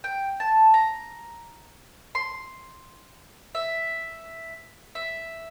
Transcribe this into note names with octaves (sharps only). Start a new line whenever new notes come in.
G5
A5
A#5
C6
E5
E5